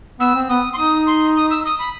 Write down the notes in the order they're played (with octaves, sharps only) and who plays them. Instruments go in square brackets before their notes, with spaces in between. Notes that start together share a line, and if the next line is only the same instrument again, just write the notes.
[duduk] B3 [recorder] E6
[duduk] C4
[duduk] B3 [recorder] D#6
[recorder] C6
[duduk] D#4 [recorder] D#6
[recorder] C6
D#6
E6
D#6
B5